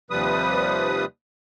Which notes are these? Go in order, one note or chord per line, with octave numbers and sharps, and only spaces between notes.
D#2 C3 F3 G3 B4 D#6